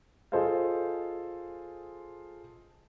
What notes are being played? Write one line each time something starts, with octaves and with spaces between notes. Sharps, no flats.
F4 G#4 A4 C5 D#5 F5